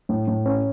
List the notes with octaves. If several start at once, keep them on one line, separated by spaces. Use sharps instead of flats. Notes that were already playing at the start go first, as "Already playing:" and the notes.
A2
A2
C#4